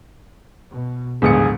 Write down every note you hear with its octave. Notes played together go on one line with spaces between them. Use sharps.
B2
D#1 A#1 A2 D3 G#3 B3 G#4 C#7